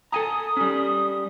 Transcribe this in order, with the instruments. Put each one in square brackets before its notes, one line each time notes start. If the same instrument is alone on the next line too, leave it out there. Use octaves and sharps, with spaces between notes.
[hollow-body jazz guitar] A4 G#5 A#5 [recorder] D#6
[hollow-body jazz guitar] G3 C#4